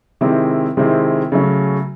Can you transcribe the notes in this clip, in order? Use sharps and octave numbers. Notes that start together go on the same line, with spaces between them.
C3 D#3 G#3 C4 E4
C3 D#3 G#3 C4 E4
C#3 F#3 A3 C#4